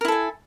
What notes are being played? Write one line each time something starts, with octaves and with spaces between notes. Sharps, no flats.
E4 A4 A#4 G#5